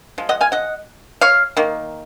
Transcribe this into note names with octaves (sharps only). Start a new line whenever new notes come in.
F3 G#3
D#5 F#5
F5 G#5
D#5 F#5
C#5 F5
D#3 A#3